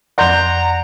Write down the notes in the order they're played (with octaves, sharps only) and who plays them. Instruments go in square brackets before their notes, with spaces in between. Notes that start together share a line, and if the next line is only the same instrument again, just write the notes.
[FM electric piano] F2 F#5 [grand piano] D5 C6 G6 [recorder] A#5